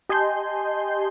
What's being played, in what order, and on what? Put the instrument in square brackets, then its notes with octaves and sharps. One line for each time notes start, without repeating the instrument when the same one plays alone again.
[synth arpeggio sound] G4 D#5 G#5 A5 C6 G6